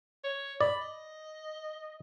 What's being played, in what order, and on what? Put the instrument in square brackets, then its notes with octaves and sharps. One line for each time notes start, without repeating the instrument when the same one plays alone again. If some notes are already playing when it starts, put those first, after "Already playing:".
[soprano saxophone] C#5
[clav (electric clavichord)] D5 [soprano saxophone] B5
[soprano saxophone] D#5